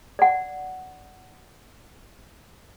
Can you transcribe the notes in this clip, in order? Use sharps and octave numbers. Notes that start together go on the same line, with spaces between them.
D5 F#5